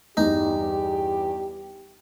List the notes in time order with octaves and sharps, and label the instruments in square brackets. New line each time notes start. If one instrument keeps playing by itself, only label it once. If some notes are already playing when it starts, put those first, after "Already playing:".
[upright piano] E2 G2 [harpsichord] D#4 [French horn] G4